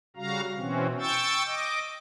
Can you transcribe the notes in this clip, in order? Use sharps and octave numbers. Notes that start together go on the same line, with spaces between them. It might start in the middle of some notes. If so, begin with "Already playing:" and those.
C#3 G3 F#4 F5 A#5
B2 E3 C4 C#4 F#4
G5 C#6 E6 G6 A6
D#5 D6